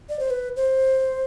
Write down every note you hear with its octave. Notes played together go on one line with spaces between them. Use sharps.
D5
C5
B4
C5